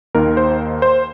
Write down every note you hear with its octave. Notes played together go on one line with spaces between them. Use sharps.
D#2 D#3 A#3 A#4
C5
C5